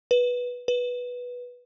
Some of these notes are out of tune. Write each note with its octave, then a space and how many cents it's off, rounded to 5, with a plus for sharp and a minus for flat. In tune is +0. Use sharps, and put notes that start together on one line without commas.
B4 -10
B4 -10